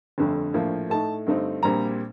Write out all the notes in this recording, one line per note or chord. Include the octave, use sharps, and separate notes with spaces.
G1 F2 D3 A3
A#1 A2 F3 A#3
A2 A3 D#4 A5
G2 D3 A3 C4 D#4
A#1 A#2 G3 C4 A#5